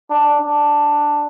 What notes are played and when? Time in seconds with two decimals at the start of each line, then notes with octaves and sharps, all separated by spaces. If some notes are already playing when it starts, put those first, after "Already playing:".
0.10 D4
0.40 D4